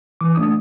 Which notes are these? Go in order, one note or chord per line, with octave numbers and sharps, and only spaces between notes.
E3 D6
A3 D4 D#6